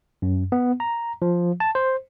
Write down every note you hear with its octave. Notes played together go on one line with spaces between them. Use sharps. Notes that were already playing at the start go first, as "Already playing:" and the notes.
F#2
B3
A#5
F3
A5
C5